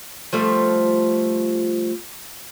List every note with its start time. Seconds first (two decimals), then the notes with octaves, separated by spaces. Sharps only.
0.33 F3 G3 A3